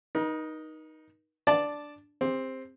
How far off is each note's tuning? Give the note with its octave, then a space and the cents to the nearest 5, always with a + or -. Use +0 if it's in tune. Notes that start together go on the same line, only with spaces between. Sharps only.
D#4 +0 A#4 +45
D4 +0 D5 +0 A5 -5
C4 +5 G4 +40